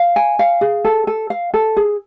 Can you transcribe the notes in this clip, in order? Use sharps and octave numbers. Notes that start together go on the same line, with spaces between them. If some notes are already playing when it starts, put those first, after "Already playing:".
Already playing: F5
G#5
F5
G#4
A4
A4
F5
A4
G#4